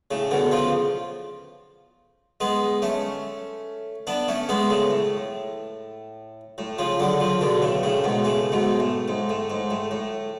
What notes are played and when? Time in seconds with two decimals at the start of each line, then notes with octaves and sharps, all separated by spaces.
0.11 A2 C#3
0.31 B2 D3
0.52 C#3 F3
2.40 G#3 B3
2.82 A3 C#4
4.07 B3 D4
4.28 A3 C#4
4.49 G#3 B3
4.70 A2 C#3
4.90 A2
6.58 A2
6.78 C#3 F3
6.99 D3 F#3
7.20 C#3 F3
7.41 B2 D3
7.62 A2 C#3
7.83 A2 C#3
8.04 G#2 B2
8.24 A2 C#3
8.52 G#2 B2
8.80 A2
9.08 G#2
9.29 A2
9.50 G#2
9.71 A2
9.91 A2